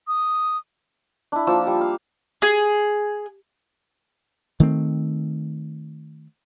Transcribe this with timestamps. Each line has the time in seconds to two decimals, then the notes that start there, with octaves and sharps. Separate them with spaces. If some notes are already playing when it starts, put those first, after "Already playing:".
0.08 D#6
1.32 D4 E4
1.47 F3 A#3 E6
1.67 G3
1.81 F5
2.42 G#4
4.60 D#3 A3 C4